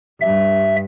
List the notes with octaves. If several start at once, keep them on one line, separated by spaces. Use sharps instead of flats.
G2 E5